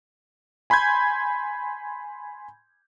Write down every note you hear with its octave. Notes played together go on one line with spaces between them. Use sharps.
G#5 B5 C6 G6 G#6